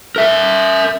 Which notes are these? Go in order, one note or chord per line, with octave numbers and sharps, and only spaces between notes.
A#4 E5